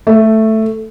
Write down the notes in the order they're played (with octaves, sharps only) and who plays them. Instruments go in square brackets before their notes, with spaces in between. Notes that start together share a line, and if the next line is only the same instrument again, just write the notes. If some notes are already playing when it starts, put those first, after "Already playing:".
[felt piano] A3